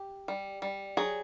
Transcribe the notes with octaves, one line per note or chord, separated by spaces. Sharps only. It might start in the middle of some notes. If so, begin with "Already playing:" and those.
Already playing: G4
G3
G3
F#3 G#4